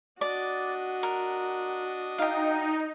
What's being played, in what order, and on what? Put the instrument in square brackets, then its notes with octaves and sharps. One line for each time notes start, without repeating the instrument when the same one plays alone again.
[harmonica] D4 D#5 [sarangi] F#4 [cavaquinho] D5
[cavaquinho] A#4
[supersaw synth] D#4 [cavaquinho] F5 G5